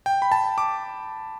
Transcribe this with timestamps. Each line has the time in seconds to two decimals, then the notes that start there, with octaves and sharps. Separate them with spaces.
0.06 G5
0.22 B5
0.32 A5
0.58 D6